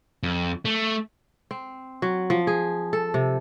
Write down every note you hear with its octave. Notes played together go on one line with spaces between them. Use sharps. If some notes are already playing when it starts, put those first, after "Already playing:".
F2
A3
C4
F#3
F3
G#4
A4
C3